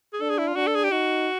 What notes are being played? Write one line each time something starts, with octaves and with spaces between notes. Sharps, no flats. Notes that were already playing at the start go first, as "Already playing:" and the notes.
G#4
D4 A4
G#4
E4
F4
D4 F#4
A4
G#4
G4
D#4 F#4